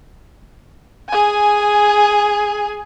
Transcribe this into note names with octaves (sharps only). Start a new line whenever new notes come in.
G#4 G#5